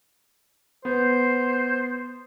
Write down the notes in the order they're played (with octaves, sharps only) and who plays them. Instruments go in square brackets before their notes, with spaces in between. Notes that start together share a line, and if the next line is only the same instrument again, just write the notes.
[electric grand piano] B3 [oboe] C5